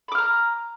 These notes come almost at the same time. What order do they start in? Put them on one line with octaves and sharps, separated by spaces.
B5 D6 F6 A#5